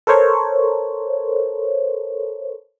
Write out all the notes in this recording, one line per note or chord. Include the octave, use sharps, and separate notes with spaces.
A4 A#4 C5 C#5